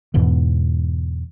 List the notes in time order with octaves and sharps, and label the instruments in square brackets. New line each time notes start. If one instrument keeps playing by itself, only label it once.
[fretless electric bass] E2 G#2 B2 E3